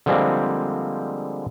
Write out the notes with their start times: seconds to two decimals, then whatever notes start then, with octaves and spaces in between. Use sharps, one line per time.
0.06 D3 F3 G3 G#3 A#3 C4